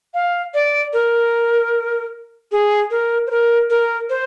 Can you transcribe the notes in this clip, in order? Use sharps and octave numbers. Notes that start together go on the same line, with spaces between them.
F5
D5
A#4
G#4
A#4
C5
A#4
A#4
C5